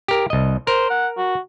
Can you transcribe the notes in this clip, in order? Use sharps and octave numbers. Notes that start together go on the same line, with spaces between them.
G4 A#4
C2 D#5
A#4 C5
F#5
F#4